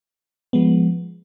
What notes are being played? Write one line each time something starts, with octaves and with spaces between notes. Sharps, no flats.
F3 G#3 B3